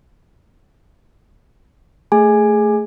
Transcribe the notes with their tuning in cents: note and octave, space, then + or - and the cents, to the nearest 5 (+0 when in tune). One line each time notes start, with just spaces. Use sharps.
A3 +0 G#4 +0 G#5 +0